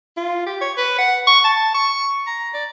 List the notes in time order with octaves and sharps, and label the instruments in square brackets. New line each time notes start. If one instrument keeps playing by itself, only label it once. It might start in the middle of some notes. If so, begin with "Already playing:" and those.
[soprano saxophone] F4
G4
C#5
B4
F#5
C#6
A5
C#6
A#5
D5